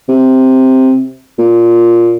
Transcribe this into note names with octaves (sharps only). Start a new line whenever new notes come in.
C3
A#2